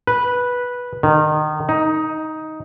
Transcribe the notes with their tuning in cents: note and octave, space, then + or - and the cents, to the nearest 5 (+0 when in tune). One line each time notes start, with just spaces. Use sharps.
B4 -10
D#3 -25
D#4 +10